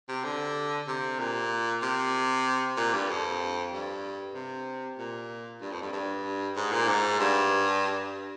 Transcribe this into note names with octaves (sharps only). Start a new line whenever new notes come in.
C3
D3
C3
A#2
C3
A#2
G2
F2
G2
C3
A#2
G2
F2
G2
G2
G#2
A#2
G#2
G2